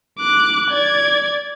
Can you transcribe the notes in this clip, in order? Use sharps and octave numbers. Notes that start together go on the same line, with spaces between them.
D6 F#6
D5 G#6